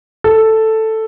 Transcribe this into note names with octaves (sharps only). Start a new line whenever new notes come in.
A4